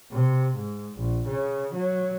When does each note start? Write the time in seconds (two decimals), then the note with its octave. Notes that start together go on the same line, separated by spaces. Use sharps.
0.12 C3
0.55 G#2
0.98 A#1
1.27 C#3
1.74 F#3